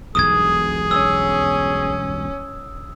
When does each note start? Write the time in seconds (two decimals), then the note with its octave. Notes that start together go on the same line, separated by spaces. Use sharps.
0.15 E1 B1 G2 G#4 D#6 G#6
0.91 C#4 E6